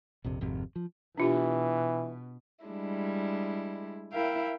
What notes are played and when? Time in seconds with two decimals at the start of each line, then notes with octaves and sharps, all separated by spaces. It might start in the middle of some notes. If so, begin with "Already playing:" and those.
0.24 A#1 F2 C3
0.41 G#1 F2 C3
0.76 F3
1.18 B2 E3 D4 F4 G4
2.64 G3 G#3 D4 E4
4.11 E4 A#4 E5 F5 G5